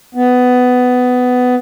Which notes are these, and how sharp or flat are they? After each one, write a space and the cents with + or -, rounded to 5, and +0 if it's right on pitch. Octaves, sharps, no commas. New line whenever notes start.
B3 +15